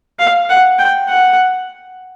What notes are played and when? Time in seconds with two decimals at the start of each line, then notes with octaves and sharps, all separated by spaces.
0.19 F5
0.50 F#5
0.78 G5
1.09 F#5